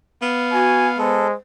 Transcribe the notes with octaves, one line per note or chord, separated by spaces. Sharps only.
B3 F5
F#4 G#5
G#3 A4 C5